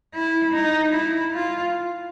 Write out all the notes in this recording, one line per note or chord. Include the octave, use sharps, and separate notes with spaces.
E4
D#4
E4
F4